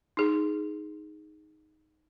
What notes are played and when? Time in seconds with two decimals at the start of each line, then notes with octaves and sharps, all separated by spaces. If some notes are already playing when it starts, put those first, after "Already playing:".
0.17 D#4 G#4